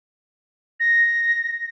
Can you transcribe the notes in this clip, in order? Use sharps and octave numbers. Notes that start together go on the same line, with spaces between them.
A#6